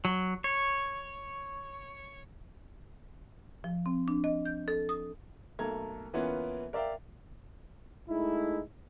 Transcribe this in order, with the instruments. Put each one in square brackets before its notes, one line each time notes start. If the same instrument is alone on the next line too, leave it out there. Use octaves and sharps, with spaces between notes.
[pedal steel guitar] F#3
C#5
[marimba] F3
C4
D4
D#5
G6
A4
D#6
[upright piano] B1 A3 A#3 A4 A#5 G#6
E3 A#3 B3 C#4 E4 F4
A#4 D5 E5 F5 G5
[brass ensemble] G#3 A3 D#4 E4